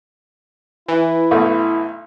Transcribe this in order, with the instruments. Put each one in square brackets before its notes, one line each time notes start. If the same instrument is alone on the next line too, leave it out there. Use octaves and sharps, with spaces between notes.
[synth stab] E3 [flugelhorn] E4
[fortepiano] B1 A3